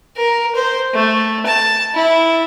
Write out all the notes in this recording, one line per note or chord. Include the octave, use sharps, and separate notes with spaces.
A#4
C5
A3
A5
E4